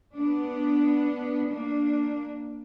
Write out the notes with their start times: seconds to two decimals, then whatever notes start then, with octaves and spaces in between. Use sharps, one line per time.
0.15 B3 D4
1.47 A#3 D4